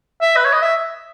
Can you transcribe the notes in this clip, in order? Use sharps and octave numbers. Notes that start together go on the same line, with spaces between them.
E5
B4
C#5
D#5
E5